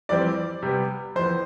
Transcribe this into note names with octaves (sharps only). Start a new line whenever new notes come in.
F2 E3 G3 C4 D5
C3 G3 B3
F2 E3 B3 C5